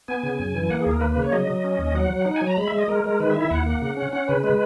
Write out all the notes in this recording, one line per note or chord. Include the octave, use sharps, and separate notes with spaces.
B3 G#5
C#3
F#2
E3
G#5
A#3 F#5
D#2 G#4
A#4
A#3 B4
C#3 B4
C#5
F#3 D#5
F#3
C#4
D#2
F#3 F#5
F#3
D#4 F#5
G#5
F#3
A#5
G#3 B5
G#3 E5
D#5
G#3 A#4
G#3 A#4
D#3 B4
E5
E4
E5
D#2 F#5
A#3
C#3
C#4
C#4 F#5
C#3 B4
G#3 B4